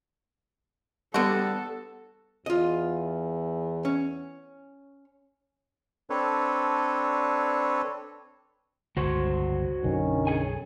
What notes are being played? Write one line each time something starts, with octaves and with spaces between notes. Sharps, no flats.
D3 G3 B3 F#4 A4
E2 F4 D#5
C#4
C4 D4 A4 B4 C#5
G1 C#2 F#4 C5 C#5
B1 F#2 D3 D#3 C#4
G#4 A4 G#5